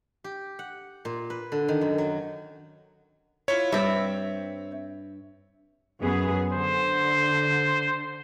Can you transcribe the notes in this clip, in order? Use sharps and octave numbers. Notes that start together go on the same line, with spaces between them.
G4
F#5
A#2
B4
D3
D#3
F#2
F#3
E4 F4 C#5
G2 C4 D5 E5
F#2 B3 G#4
D3 C5